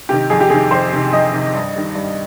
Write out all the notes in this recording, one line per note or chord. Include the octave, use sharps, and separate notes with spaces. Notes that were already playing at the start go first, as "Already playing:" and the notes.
C3 D#3 G4
F2 G#4
G4
C3 D#3 G#4
F2 C5
C3 D#3
F2 D#5
C3 D#3
G2
D#3 G3
G2